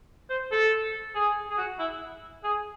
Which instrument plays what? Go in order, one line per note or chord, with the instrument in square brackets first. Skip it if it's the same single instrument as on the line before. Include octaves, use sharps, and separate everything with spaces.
[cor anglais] C5
A4
G#4
G#4
F#4
E4
G#4